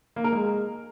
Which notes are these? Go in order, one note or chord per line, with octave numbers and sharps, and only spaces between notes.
A#3
A#4
G#3